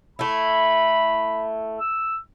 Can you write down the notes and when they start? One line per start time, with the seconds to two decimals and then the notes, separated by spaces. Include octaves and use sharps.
0.19 A3 E4 B5
1.79 E6